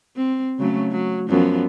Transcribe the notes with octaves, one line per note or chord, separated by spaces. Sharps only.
C4
C#3 F#3 A3
F#3
F#2 F3 B3